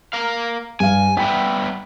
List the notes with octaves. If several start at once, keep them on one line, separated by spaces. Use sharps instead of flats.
A#4 F5
G2 F5 G#5
G3 B3 E5 G5 B6